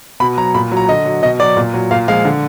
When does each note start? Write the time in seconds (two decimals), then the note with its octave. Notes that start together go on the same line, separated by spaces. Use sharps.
0.20 B2 B5
0.38 F#3 A#5
0.55 A#2 B5
0.72 F#3
0.77 A#5
0.89 D3 D#5
1.06 F#3
1.22 B2 D#5
1.40 F#3 D5
1.57 A#2
1.74 F#3
1.91 A#2 F5
2.08 F3 G#3 F5
2.25 D3